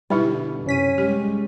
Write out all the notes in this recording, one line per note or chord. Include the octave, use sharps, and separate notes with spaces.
B2 D3 G3 D#4 E4 G4 B4
F#2 C3 C#4 B6 D#7
G3 G#3 G4